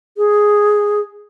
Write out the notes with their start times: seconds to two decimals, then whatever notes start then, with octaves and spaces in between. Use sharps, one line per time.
0.17 G#4